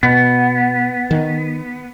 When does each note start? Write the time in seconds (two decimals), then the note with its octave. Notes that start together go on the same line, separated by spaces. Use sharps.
0.03 B2 B3
1.11 D#3